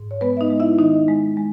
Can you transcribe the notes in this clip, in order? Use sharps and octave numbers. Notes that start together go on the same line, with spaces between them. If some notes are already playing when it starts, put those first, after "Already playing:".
Already playing: G#2
C#5
G#3 B3 B4
E5
D#4 D#5
G#3
E4 E5
D#3 D#4 D#5
G#3
G#3